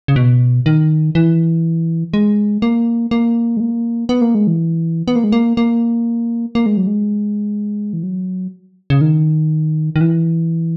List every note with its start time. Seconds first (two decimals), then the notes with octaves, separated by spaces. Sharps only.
0.08 C#3
0.16 B2
0.66 D#3
1.15 E3
2.14 G#3
2.62 A#3
3.11 A#3
3.57 G#3
3.60 A#3
4.09 B3
4.21 A#3
4.35 G#3
4.47 E3
5.08 B3
5.16 A#3
5.24 G#3
5.32 A#3
5.57 A#3
6.55 A#3
6.66 G#3
6.77 F#3
6.87 G#3
7.93 E3
8.03 F#3
8.90 C#3
9.01 D#3
9.96 D#3
10.01 E3